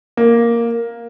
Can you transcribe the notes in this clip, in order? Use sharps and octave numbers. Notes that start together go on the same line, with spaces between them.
A#3